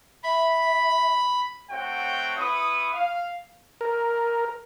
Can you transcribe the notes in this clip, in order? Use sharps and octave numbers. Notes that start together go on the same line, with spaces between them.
E5 B5
A3 C4 F#4 C#5 G5
E4 B4 C#6 D#6
F5
A#4